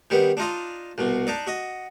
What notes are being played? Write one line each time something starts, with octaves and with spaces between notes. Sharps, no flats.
D#3 G3 B3
D4 D#4 F4 D#5
C2 B2
D4 D#4 D5
F#4 D#5